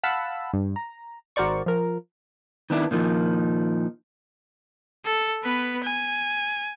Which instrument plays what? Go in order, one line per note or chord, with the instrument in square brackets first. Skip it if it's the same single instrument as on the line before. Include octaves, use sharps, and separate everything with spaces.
[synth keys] F5 F#5 A5 B5 E6
G2
A#5
G#1 F#4 A#4 C5 D5 C#6
F3 A#4
[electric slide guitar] D#3 B3 D4 E4
A#2 D#3 F3
[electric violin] A4
B3 B4
G#5